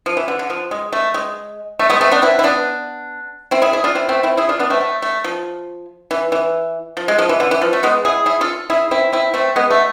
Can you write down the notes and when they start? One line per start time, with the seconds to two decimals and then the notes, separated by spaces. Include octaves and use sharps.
0.06 F3
0.17 E3
0.28 D3
0.39 D3
0.50 F3
0.71 G#3
0.93 A3
1.14 G#3
1.79 A3
1.89 G#3 B3
2.01 A3 C4
2.11 B3 D4
2.22 C4 E4
2.39 E4
2.43 B3 D4
3.51 C4 E4
3.62 E4 G#4
3.73 E4 G#4
3.84 D4 F4
3.95 C4 E4
4.09 A3 C4
4.23 C4 E4
4.37 E4 G#4
4.49 D4 F4
4.59 B3 D4
4.70 A3 C4
4.81 A3
5.02 A3
5.24 F3
6.11 E3
6.32 E3
6.97 F3
7.08 G#3
7.19 F3
7.29 E3
7.40 D3
7.51 E3
7.61 F3
7.73 A3
7.83 G#3 B3
8.05 E4 G#4
8.26 E4 G#4
8.41 F4 A4
8.70 E4 G#4
8.91 C4 E4
9.13 C4 E4
9.34 A3 C4
9.56 G#3 B3
9.70 A3